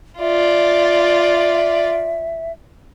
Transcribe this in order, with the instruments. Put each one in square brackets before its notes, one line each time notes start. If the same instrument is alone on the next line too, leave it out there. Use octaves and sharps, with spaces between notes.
[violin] F4 D5 [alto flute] E5